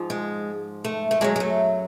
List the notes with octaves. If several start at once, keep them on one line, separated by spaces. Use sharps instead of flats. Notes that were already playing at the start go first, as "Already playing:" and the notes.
Already playing: G#2 F3
G#3
A3
A3
F#2 D3 F#3 G#3
G#3
A3